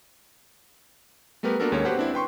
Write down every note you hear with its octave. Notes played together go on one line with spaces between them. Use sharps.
G3 A3 B3 G4 A#4 B4
A#3 B3 D4 F#4 A4 A#4
D#2 G#3 C#4 A#4 C#5
F#4 G4 B4 C5 F#5
C4 D4 E4
B4 G5 C6 C#6